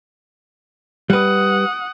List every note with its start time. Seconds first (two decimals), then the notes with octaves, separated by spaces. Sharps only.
1.10 G3 B4 F#5 D#6